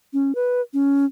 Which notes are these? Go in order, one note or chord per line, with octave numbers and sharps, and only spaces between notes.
C#4
B4
C#4